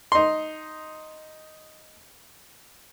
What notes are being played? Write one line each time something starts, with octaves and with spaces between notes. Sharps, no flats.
D#4 C6